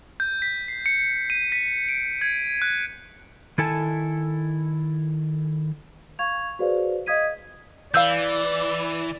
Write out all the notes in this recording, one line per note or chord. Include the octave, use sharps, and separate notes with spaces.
G6
B6
C7
C#7
D#7
B6
D7
G#6
F#6
D#3 E4 A4 G#5 A5
F5 C#6 G#6 F7
F#4 G#4 B4 C5 D5 F5
D#5 F5 D#6 G#6 B6 D#7
E3 D5 F5 E6 G6